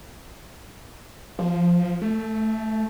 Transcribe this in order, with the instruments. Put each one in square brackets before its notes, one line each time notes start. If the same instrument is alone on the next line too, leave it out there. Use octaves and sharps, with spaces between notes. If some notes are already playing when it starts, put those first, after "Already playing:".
[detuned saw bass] F3
A3